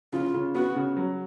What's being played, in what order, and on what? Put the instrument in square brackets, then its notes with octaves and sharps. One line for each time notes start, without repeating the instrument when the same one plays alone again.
[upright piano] C#3 [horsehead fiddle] F4
[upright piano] C#3
[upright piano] B3 [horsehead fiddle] F#4
[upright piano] C#3
F#3